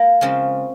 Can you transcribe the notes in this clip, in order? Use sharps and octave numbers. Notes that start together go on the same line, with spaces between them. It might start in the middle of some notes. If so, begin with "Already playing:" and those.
Already playing: A#3
C#3 F3 G#3 C4